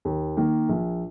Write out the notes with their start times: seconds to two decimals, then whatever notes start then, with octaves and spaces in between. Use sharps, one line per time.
0.05 D#2
0.37 D#3 A#3
0.69 A#1